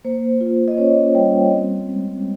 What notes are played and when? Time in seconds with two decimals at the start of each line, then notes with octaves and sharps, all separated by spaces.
0.05 A#3 C5
0.41 F4
0.68 D#5
0.77 C#4 C#5
1.15 G3 G5
1.51 C4
1.89 G#3